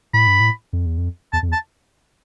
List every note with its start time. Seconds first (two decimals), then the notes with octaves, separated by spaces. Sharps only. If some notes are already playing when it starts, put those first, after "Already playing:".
0.13 A2 B5
0.27 G2
0.40 A2
0.73 F2
0.86 E2
0.98 F2
1.33 E2 A5
1.43 F2
1.48 E2
1.52 A5